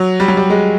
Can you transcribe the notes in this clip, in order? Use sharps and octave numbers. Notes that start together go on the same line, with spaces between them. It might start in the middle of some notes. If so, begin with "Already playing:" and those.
Already playing: F#3
G3
F#3
G3
G#3